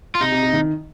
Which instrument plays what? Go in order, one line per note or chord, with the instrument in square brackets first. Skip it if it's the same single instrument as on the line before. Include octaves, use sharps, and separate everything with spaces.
[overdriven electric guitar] F4
[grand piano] C3 [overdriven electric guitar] D#4
[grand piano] C3
C3
D#3